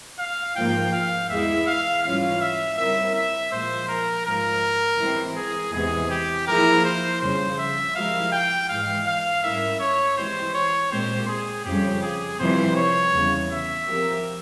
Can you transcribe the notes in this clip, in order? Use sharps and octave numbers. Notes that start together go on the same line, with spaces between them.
F5
G#2 F3 A#3 F4 G5
F5
E2 E3 G#3 E4 G#4 E5
F5
G#2 E3 G3 C#4 F4 F5
E5
C#3 G3 C4 E4 A#4 E5
E5
A#2 F3 G#3 C5
A#4
G#2 F3 G#3 A#4
E3 G#3 C4 G4
G#4
E2 C3 E3 G#3 G#4
G4
F3 A#3 E4 G#4 A#4
C5
F2 C#3 G3 C5
E5
F3 G#3 E4 G4 A#4 F5
G5
G#2 E3 G#3 F5
F5
G#2 G3 C#4 E4 A#4 E5
C#5
E3 G#3 C4 G4 C5
C#5
A#2 G#3 C4 G4 C5
G#4
F2 C#3 G3 G4
G#4
F2 C3 E3 G3 C4 C5
C#5
E2 C#3 G3
E5
F3 C4 G4 A#4